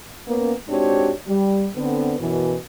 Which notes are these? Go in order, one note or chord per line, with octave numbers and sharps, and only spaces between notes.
A#3 B3 C#4
G#2 C4 D4 F#4 G4 C#5
G3
D3 B3 C4
F#2 B2 E3